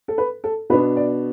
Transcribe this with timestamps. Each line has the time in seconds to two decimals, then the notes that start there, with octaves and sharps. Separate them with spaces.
0.08 A4
0.18 B4
0.44 A4
0.70 B2 B3 D4 B4
0.96 D5